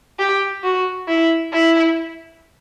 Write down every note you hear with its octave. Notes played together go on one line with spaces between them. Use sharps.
G4
F#4
E4
E4